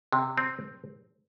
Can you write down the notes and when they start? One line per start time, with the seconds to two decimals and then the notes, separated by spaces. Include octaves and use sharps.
0.12 C3
0.38 C4